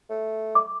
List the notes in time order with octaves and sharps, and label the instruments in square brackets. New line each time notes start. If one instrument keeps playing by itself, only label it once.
[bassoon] A3
[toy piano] D6